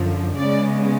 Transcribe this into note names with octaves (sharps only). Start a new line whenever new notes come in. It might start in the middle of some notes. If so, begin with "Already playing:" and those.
Already playing: F#2 D3 F3
C#3 G#3 B3 D5